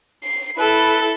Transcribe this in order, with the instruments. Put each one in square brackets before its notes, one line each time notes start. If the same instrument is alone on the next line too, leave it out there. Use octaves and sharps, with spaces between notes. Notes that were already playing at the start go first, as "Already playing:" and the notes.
[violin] C7
[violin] E4 A4 [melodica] B4 B5